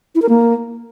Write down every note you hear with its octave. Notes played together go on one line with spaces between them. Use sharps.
E4
A#4
A#3